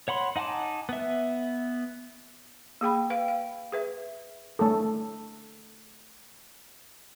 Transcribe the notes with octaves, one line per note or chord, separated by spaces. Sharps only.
C#5 F#5 B5 C6
D#4 F#5 G#5 A5 D6
B3 E5
A#3 G#4 G5 B5
B4 F5 G5
F5
G#4 B4 E5
A3 A4